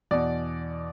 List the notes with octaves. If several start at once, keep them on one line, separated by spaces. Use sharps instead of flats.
E2 B2 D5